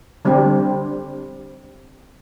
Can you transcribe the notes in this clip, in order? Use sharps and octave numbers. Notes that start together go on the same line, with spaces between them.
D3 G3 C4 D4 G4